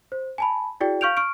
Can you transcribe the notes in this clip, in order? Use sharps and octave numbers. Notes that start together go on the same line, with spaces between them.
C5
G#5 A5 B5
E4 F#4 G#4 D5 G5
F5 C#6 F6 G6 D7 F7
C#6 F6 D7